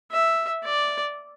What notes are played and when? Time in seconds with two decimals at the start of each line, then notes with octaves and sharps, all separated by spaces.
0.12 E5
0.64 D5